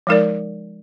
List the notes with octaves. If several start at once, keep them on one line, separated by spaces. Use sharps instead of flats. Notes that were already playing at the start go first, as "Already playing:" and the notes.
F3 G#3 D#4 A#4 D5